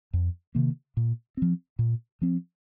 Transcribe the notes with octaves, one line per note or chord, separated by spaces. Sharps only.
F2
C3 D#3 A#3
A#2
F3 C4
A#2
F3 C4